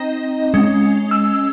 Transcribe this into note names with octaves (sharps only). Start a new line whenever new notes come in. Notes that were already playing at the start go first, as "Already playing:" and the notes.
Already playing: C4 D#4 D#5
G#3 C#4
E6